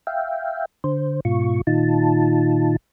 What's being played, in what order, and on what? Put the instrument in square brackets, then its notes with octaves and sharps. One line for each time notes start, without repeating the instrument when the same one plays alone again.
[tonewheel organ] E5 F5 G5
D3 C5
G#2 B2 F4 C#6
A#2 D#3 D#4 F4 A5